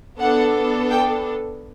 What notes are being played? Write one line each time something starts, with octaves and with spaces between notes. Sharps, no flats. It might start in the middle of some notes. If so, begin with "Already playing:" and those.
B3 D4 A4 F#5
G5